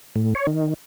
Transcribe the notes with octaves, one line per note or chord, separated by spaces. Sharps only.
A2
C#5
D#3